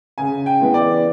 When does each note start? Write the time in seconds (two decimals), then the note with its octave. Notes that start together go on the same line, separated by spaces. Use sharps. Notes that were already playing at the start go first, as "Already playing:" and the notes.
0.18 C#3 G#5
0.46 G5
0.60 E3 G#3 B3
0.74 D5